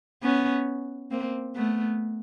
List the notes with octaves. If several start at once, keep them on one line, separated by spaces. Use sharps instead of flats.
B3 C#4
A#3 C4
A3 B3